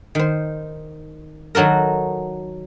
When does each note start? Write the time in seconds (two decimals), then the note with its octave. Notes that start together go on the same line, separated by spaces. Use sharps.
0.15 D#3 C5
1.55 D#3 F#3 F#4 A4 A#4